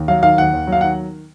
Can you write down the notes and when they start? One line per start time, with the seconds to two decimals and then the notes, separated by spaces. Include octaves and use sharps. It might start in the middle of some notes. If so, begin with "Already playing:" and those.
Already playing: D#2
0.08 F#3 F5
0.23 D#3 F5
0.38 D#2 F#5
0.53 D#2
0.67 F#3
0.72 F5
0.81 D#3 F#5